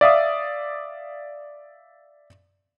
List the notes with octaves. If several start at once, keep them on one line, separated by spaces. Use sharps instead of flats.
D5 E5 F5 D#6